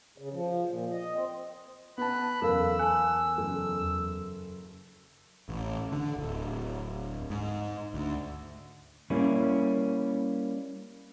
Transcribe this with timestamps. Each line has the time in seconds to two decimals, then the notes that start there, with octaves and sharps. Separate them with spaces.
0.18 C#3
0.33 F3
0.68 A#2
0.92 D#5
1.14 C4
1.98 B3 B4 A5 B5 F#6
2.42 F#1 E2 A4 A#4 F5 E6
2.79 G#5 A5 F#6
3.38 F#1 A4
5.49 A1
5.92 D3
6.17 D1
7.30 G#2
7.94 D2
9.10 G3 A#3 C#4 E4